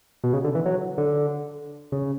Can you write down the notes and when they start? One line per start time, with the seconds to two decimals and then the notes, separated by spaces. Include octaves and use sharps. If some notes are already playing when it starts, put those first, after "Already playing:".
0.24 B2
0.33 C#3
0.44 D3
0.55 E3
0.66 F#3
0.98 D3
1.92 C#3